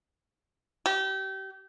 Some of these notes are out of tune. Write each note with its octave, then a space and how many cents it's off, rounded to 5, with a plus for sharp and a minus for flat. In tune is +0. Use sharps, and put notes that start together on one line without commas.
G4 -30